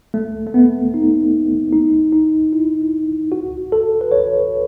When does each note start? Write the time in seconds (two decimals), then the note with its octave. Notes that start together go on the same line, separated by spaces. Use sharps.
0.14 A3
0.46 A3
0.54 B3
0.94 D#4
1.73 D#4
2.13 D#4
2.53 E4
3.32 F#4
3.72 A4
4.01 B4
4.12 C#5